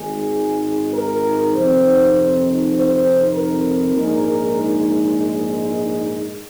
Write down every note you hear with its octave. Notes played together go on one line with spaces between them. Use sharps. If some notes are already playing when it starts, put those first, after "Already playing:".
Already playing: G#1 G#2 G#3 G#4
A#4
F2 C3 D#3 C4 D#4 C5
C5
A#4
A#1 G#2 G#3 D#4